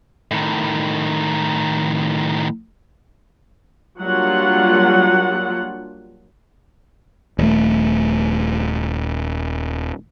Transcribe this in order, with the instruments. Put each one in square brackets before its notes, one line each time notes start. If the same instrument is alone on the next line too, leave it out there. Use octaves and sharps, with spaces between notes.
[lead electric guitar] A2 D#3
[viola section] F#3 G3 A#3 D4 F4 F#5
[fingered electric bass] D#1 A3